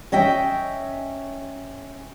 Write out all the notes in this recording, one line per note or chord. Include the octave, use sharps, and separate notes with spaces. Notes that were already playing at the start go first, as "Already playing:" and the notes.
C#4 D#5 E5 G5